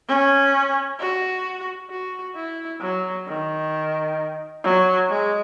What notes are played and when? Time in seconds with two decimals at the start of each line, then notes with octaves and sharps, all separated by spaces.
0.08 C#4
1.00 F#4
1.90 F#4
2.36 E4
2.81 F#3
3.27 D#3
4.64 F#3
5.09 G#3